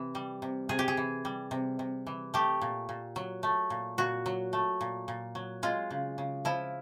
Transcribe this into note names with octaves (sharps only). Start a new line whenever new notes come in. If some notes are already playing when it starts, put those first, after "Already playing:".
Already playing: C3 E3
G3
C3
C3 G#4
G4
G#4
E3
G3
C3
C3
E3
A3 G4
A#2
A#2
F#3
A3
A#2
A#2 F#4
F#3
A3
A#2
A#2
F#3
G#3 F4
C#3
C#3
F3 E4